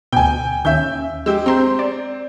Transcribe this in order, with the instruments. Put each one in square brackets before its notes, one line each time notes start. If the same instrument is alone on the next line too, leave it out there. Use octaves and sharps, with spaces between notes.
[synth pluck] D2 B2 [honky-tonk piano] G5 G#5
[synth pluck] D#2 C#4 [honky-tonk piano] E5 G6
[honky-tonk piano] G#3 G4 [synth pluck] E6
[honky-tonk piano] C4 [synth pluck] A#5 C6 G6
[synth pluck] D5